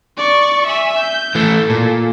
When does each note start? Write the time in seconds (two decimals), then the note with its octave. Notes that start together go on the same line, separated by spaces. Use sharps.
0.17 D5 C#6
0.66 E5 G#5
0.99 G6
1.35 E3 A3 A4
1.70 A#2